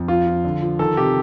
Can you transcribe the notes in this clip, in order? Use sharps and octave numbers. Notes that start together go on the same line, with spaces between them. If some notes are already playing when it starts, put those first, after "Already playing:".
Already playing: F2
F3 F4
F3
D3
F3
D#3 A4
C3 G4